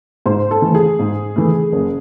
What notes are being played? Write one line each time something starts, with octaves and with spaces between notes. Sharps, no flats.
G#2 C5
A4
E3 A3
G#4
G#2
E3 A3
F#1